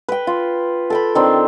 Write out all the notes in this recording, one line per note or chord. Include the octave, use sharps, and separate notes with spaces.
B4 G5
F4
A4 G5 B5
D#3 C4 D4